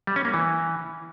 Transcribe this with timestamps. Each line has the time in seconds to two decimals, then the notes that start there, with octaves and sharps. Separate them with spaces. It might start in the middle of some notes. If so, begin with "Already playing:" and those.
0.07 G3
0.16 C#4
0.25 A#3
0.34 E3